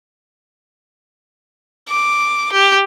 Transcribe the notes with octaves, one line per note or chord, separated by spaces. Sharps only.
D6
G4